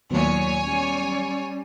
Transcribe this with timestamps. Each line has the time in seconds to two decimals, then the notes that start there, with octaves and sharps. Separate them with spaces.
0.11 D#2 A#2 D#3 F#3 B3 C#5 G#5
0.64 G3 C#4